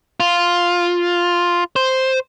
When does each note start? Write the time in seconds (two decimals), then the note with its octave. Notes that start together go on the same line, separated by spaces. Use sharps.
0.20 F4
1.76 C5